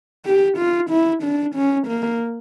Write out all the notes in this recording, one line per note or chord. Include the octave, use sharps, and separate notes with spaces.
G4
F4
E4
D4
C#4
A#3